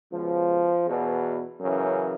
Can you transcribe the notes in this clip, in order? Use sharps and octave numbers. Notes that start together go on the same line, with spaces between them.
C#2 B2 F3
E2 B2
F#2 C#3 E3